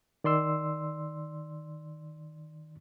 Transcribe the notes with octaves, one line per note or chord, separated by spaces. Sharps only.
D#3 D5 C6 E6